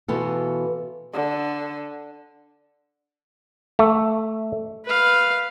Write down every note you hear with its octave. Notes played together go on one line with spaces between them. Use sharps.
B2 E3 B3 F4 F#4 A4
D3
A3
B4 F5